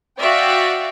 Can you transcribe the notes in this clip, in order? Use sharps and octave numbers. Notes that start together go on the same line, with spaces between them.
F#4 D5 E5 F5 G5